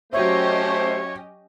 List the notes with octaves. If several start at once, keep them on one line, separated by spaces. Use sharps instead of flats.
F#3 A3 C#4 G4 C5 C#5 D#5 E5